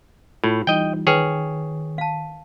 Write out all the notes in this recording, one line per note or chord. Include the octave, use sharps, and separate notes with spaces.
A2 F4
E3 G3 D#4 D#5 G5
D#3 G#4 B4 C#5 G5
F5 A5